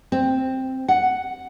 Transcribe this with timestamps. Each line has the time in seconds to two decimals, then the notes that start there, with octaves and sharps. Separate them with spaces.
0.12 C4
0.88 F#5